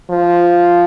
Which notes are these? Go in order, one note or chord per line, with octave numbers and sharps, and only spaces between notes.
F3